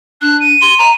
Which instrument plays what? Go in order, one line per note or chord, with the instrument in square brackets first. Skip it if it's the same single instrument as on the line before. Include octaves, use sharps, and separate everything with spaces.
[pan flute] D4 [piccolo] F#6
[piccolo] D#7
[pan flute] C6
A#5